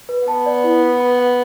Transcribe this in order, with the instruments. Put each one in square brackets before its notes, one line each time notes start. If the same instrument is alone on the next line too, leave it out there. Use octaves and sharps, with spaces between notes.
[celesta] B4
[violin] B3 [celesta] A5
[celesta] D5
E4
B4
B5
F#5